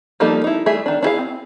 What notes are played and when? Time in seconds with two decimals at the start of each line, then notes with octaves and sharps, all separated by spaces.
0.20 F3 G3 A#3 D#4 A4
0.44 D#4 E4
0.66 G3 A3 G#4 E5
0.86 D#3 D4
1.03 D4 E4 G#4 F5
1.18 C4